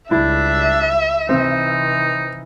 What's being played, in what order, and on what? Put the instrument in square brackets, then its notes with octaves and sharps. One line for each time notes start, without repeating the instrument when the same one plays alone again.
[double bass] C#2 G3 [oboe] D4 [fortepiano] E4 [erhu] E5
[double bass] C3 E3 [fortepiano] C4 [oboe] D#4